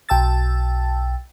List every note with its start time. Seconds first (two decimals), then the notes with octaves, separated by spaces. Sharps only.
0.09 B1 G5 A5 E6 A6